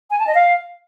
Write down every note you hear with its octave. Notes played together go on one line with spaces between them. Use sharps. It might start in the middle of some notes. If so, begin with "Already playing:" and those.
G#5
A5
D#5
F5